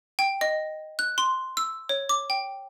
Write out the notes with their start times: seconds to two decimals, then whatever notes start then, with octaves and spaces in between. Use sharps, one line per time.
0.19 G5
0.41 D#5
0.99 F#6
1.18 C6
1.57 E6
1.89 C#5
2.09 D6
2.30 G5